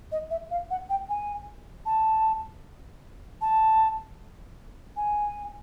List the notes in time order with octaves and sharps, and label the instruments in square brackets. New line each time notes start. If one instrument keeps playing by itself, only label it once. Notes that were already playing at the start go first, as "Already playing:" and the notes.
[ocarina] D#5
E5
F5
F#5
G5
G#5
A5
A5
G#5